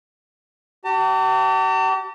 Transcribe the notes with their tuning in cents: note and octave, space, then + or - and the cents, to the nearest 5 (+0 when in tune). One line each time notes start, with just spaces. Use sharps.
G4 -45 A5 +40